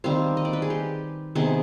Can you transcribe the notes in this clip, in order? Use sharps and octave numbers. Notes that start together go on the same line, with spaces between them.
D#3 G3 C4 F5
D#5
D5
B4
G#4
G4
C3 D#3 B3 G#4